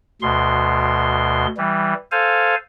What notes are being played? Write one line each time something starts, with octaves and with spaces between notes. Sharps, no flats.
D2 B2 C6
E3 G3
A4 C5 F5 G#5